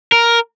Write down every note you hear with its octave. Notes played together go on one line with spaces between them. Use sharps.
A#4